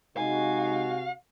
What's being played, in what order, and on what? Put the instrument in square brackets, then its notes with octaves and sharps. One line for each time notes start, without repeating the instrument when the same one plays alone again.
[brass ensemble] C3 F#4 [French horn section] G#3 D#4 [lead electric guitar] F5 [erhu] G#5